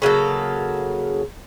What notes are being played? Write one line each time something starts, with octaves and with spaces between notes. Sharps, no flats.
C#3 F#3 A#3 A4